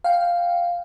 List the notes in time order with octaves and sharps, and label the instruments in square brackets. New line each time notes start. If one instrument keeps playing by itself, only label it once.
[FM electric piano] F5 G5